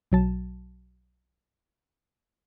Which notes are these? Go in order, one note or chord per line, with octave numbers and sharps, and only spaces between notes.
B1 F#3 A5